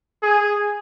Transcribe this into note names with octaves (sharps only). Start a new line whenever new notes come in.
G#4